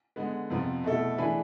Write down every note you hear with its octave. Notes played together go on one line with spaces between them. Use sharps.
D3 G#3 B3
F2 C3 F3 B3
B2 A3 E4 A4
E3 A3 D4 G#4 B4